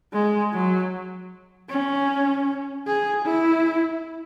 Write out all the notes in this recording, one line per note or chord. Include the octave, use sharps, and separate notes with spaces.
G#3
F#3
C#4
G#4
E4